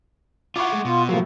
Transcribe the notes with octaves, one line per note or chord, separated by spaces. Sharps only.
E4 F4 F#5 C#6 D6
G#3 A3
B2 F4
A2 C3 F3 F#3 A#3